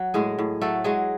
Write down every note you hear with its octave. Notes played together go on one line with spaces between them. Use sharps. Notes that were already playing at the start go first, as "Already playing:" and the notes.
Already playing: F#3
A2 G#3 G#4
A2
F#3 A3 A4
F#3 G#3 G#4